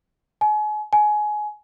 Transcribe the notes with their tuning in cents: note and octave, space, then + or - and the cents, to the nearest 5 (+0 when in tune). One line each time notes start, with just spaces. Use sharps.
G#5 +35
G#5 +20